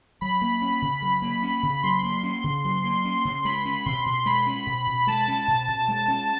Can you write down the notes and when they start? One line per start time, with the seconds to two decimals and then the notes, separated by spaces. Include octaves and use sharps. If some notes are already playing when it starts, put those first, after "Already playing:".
0.21 F#3 B5
0.42 A#3
0.62 C#4
0.82 C#3
1.02 F#3
1.22 A#3
1.43 C#4
1.63 C#3
1.83 F#3 C6
2.03 A#3
2.23 C#4
2.44 C#3
2.64 F#3
2.84 A#3
3.05 C#4
3.25 C#3
3.45 G#3 B5
3.65 C#4
3.86 B2 C6
4.06 B2
4.26 G#3 B5
4.46 C#4
4.66 B2
4.87 B2
5.07 G#3 A5
5.28 C#4
5.48 B2
5.68 B2
5.88 G#3
6.08 C#4